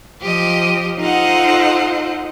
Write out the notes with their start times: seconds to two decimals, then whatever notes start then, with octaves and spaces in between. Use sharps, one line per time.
0.23 F3 G4 D#5
0.99 D#4 F4 A4 C5 D#5 F#5